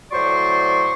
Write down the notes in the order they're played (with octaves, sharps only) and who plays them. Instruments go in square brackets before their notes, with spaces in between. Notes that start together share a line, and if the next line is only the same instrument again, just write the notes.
[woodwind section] A2 F#3 C5 D5 C6 C#6